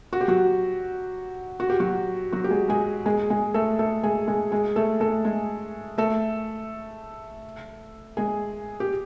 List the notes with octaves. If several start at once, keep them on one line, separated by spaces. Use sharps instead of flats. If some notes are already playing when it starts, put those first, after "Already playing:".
F#4
G4
F#3 F#4
F#4
G4
F#3 F#4
F#3 F#4
G4
G#3 G#4
G#3 G#4
G#3 G#4
G#3 G#4
A3 A4
A3 A4
G#3 G#4
G#3 G#4
G#3 G#4
A3 A4
A3 A4
G#3 G#4
A3 A4
G#3 G#4
G4